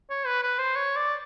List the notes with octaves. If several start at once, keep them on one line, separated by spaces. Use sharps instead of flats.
C#5
B4
B4
C5
C#5
D5